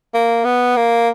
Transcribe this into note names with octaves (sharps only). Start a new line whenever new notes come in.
A#3
B3
A#3